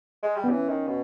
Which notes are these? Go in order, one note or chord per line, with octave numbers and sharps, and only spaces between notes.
G#3
G3
B3
E3 C#4
D#3
B2